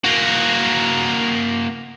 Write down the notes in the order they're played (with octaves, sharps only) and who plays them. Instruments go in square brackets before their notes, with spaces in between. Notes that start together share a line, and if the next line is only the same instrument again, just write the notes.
[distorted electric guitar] A#3 F#4